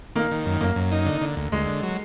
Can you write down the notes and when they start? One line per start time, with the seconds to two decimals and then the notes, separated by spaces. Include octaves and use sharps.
0.15 D#3 A#3
0.31 D#3
0.45 F#2
0.61 F#2 A#3
0.76 F#2
0.92 D#4
1.06 D3
1.21 D3
1.36 D2
1.52 D2 G#3
1.67 D3
1.83 F#3